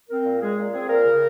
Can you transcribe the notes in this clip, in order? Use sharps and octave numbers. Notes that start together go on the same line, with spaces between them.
C4 A#4
A#2
G#3 G#4
A#2
C4 G#4
A#2 A#4
C#3